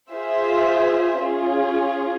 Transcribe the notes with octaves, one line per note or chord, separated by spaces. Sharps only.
F4 G#4 C5 E5
C#4 F4 G#4